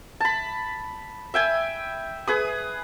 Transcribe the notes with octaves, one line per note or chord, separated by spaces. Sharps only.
A5 B5
E5 G5 G#5
G#4 B4 D#6